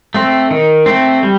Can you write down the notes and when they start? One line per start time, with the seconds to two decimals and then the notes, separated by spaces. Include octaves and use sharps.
0.14 A3 C4
0.51 D#3
0.86 A3 C4
1.23 G3